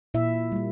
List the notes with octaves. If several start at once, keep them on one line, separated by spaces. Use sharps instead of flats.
A#2 E4 E5
G3 A#3